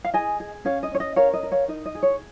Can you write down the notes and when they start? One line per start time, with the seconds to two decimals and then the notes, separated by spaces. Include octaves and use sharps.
0.04 F5
0.14 G#4 D#5 G#5
0.40 G#4
0.65 C#4 C#5 F5
0.83 D#5
0.92 C#4 C#5
1.00 D#5
1.16 A#4 C#5 F5
1.33 D#5
1.43 A#4
1.52 C#5 F5
1.68 D#4 D#5
1.86 D#5
1.95 G#4
2.03 C#5